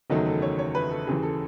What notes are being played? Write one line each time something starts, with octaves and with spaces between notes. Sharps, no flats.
F#1 E2 D#3 F#3 A3 D#4
A4
C#5
C#5
B4
A4
D#2 C#3 E3 G#4
A4